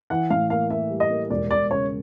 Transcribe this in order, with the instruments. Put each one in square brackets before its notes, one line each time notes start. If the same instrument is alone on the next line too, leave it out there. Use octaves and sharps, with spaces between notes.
[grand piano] E3 [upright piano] F#5
[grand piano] A2 [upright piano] F5
[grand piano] A#3 [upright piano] F5
[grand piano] A#3 [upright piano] E5
[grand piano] G3
[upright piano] D#5
[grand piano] A#3
[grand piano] E1 [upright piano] D5
[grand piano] E1 [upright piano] D5
[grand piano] C#3 [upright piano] C#5